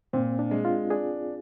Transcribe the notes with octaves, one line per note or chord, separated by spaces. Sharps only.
A#2 C4
D4
G#3
F4
D4 G#4